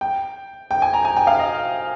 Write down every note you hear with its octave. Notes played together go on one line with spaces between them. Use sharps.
G5
G5
G#5
A#5
G#5
G5
F5
D#5